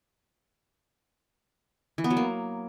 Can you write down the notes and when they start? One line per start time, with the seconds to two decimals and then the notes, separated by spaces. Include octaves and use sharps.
1.98 E3
2.04 B3
2.10 F#3
2.17 A#3